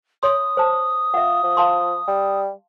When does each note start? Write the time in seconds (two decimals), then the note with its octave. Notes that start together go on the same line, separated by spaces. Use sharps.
0.23 C#5 C6 D#6
0.57 C5 A5
1.14 F4 E5 F#5
1.43 F3
1.57 F5 A5 C6
2.08 G3